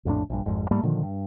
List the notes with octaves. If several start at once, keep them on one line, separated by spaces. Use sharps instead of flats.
A#1 F2 A2 D4
A#1 G2
G#1 F2 G#2
G#2 G3 A3 A#3
A#2 D3 D#3 F3
G2